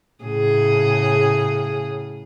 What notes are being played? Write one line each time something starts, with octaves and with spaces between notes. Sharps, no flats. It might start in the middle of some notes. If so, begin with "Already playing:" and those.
A2 C#3 G#4